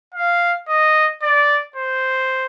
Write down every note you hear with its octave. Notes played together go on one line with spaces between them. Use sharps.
F5
D#5
D5
C5